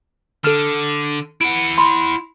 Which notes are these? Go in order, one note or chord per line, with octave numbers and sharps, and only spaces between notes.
D3 A4 F6
E4 F#5 D7
B5 C6